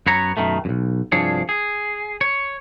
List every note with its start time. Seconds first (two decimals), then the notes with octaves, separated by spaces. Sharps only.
0.07 F#2 B3 C#5 A#5
0.37 F#2 B2 D#3 A3
0.65 B1 F#2
1.12 C2 G2 F3 D4 G#4 C#5
1.49 G#4
2.21 C#5